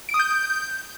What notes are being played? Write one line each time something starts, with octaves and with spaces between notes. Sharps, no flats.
D7
D#6
G6